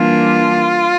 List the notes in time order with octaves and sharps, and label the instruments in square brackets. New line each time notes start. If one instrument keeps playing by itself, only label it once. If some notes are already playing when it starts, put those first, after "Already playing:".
Already playing: [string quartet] E3 G3 A#3 D4 F4